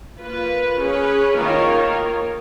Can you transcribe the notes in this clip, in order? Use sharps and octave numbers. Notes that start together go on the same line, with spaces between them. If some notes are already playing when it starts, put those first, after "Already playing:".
A#3 F4 B4
C#4 G#4 B4
D#3 A#3 F4 A#4 C#5